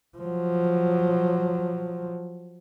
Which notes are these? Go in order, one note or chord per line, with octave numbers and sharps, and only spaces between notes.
F3 F#3